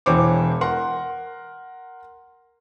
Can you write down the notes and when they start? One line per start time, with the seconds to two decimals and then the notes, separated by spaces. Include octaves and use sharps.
0.06 E1 E3 C5 C#5 D6
0.61 A#4 F#5 C6